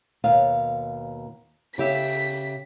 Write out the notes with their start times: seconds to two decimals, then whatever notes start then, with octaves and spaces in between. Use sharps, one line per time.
0.24 D#2 B2 F5
1.78 C#3 G4 E5 B6